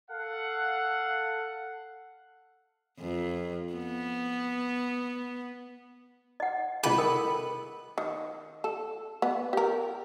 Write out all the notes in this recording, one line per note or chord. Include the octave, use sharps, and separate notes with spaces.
A4 F5 F#5
F2
B3
D#5 F#5
C2 G#4 B4 D#5 G#5
A4 A#4 G5
D#3
A4
B3
G4 A#4